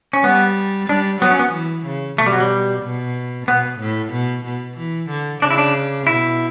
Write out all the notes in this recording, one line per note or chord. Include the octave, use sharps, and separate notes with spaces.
C#4
G3 B3
G3 D4
F#3 B3
C#4
B3
E3
C#3
B2 A3
G3
F#3
G3
B2
B2 B3
A2
B2
B2
E3
D3
C#3 D4
E4
D4
B2 E4